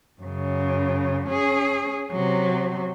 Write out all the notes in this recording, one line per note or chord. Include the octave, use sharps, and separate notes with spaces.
F#2 C#3
C#4 G#4
C3 F#3